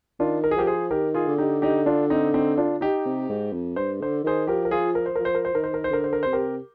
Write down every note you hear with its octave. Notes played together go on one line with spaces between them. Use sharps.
D#3 D4 F4
A#4
G#4
F3 G4 A#4
G#4 C5
D#3 G4 A#4
F4 G#4
D3
D#4 G4
D#4 G4
D4 F4
C4 D#4
C4 D#4
D4 F4
D#4 G4
C3
G#2
F2
G2 C5
D3 C5
D#3 G#4 C5
F3 G4 A#4
A#4
F4 G#4
A#4
C5
F3 A#4
C5
A#4
C5
D#3 A#4
C5
A#4
C5
D3 A#4
C5
A#4
C3 C5
G4 A#4